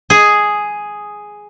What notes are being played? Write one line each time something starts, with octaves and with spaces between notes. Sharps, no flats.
G#4